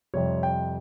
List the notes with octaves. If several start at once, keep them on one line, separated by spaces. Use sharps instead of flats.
F2 C3 G3 C#5
G5